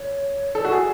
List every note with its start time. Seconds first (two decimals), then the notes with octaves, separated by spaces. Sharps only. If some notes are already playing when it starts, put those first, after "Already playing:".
Already playing: C#5
0.55 A4 D5
0.65 F#4
0.71 G#4